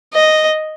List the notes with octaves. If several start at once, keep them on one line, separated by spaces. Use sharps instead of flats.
D#5